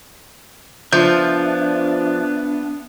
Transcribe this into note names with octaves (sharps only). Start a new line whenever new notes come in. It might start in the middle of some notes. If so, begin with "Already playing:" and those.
F3 B3 D4 E5 G6